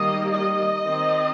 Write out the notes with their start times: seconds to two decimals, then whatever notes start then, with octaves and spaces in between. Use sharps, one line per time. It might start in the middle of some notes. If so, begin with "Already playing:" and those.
Already playing: D#3 G3 A#3 D#5
0.32 D#5
0.83 D#3 C4